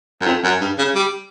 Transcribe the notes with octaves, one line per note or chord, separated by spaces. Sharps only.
F#2
F2
F#2
G2
C#3
G3